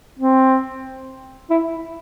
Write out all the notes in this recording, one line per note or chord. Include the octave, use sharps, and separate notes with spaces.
C4
E4